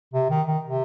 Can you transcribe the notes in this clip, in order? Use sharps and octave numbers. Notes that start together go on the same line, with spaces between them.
C3
D#3
D#3
C3